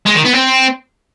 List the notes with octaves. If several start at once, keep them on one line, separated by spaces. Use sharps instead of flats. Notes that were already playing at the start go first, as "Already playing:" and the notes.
G#3
D#3
B3
C4